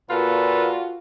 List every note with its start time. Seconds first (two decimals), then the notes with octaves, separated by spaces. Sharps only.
0.10 A#2 F4 F#4 A4 B4